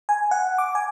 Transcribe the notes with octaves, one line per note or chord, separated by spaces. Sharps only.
G#5
F#5
D6
G#5